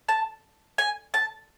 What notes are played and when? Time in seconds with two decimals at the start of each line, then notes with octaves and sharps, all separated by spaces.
0.09 A5
0.78 G#5
1.14 A5